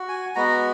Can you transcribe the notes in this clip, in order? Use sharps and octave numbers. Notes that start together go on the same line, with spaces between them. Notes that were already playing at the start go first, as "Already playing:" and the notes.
Already playing: F#4
G#5
G#3 B3 F#4 A#5